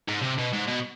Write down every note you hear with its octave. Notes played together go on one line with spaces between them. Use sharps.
G#2
C3
B2
G#2
B2